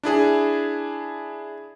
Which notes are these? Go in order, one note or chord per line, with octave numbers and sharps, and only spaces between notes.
D4 E4 G#4